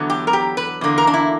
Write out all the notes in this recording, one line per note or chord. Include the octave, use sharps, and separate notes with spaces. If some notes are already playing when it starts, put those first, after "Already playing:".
Already playing: E2 D3 F#3 B3
G4
A#4
G4
B4
E2 D3 A#3
A#4
D4
E4